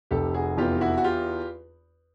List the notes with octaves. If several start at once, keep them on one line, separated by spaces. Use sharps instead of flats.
F1 G4 A4
F#4 G#4
E2 F4 G4
E4 F#4
F#4
F4 G4